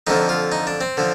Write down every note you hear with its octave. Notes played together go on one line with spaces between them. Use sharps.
F2 D3 F3 D#4
F4
D#4
D4
C4
D3 F3